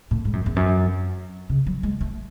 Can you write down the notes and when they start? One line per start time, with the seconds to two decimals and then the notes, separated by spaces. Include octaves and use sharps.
0.11 A2
0.25 G#2
0.33 F#2
0.46 E2
0.56 F#2
1.50 C#3
1.67 F#3
1.83 G#3
2.01 A3